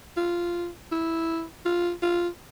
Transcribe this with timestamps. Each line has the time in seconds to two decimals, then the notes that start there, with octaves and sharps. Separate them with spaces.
0.17 F4
0.92 E4
1.65 F4
2.02 F4